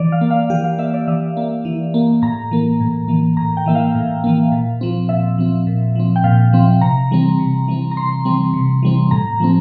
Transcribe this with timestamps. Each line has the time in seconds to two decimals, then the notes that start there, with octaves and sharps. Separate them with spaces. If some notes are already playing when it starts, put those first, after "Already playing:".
Already playing: E3 D5
0.12 F5
0.21 A#3
0.31 F5
0.50 E3 G4
0.64 F5
0.78 A#3 E5
0.94 D5
1.08 E3 E5
1.37 A#3
1.65 E3
1.94 A#3
2.22 A2 A#5
2.51 E3 A#3
2.80 A2
3.08 E3 A#3
3.37 A2 A#5
3.57 G5
3.66 E3 A#3 E5
3.75 F5
3.95 A2
4.24 E3 A#3
4.52 A#2
4.81 F3 C4
5.09 A#2 E5
5.38 F3 C4
5.67 A#2
5.95 F3 C4
6.16 G5
6.24 A#2 F5
6.53 F3 C4
6.81 C3 A#5
7.11 E3 G3 C4
7.39 C3
7.68 E3 G3 C4
7.91 A#5
7.97 C3 C6
8.25 E3 G3 C4
8.53 C3
8.83 E3 G3 C4
9.11 A2 A#5
9.40 F3 A3 C4